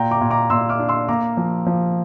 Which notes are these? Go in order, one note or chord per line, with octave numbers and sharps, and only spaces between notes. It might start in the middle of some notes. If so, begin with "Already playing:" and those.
Already playing: A#2 G5 A#5
A#5 D6
A#2
A#5 D6
A#2 C6 E6
D6 F6
D4
C6 E6
A#3 A#5 D6
F3
F3